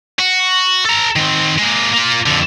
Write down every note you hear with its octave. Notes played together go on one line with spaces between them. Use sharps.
F#4
A4 A#5
D#3 C4
G#3 A#3
A#3 F4
F2 D3